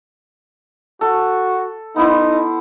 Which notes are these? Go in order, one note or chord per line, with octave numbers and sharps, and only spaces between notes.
F#4 A4
B3 D#4 E4 C5